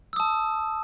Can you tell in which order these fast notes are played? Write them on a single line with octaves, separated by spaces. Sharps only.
E6 D#6 A5